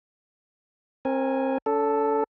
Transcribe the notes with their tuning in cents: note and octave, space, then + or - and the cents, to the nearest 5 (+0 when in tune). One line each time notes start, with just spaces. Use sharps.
C4 +30 A#4 +0 G#5 +0
C#4 +45 A4 +0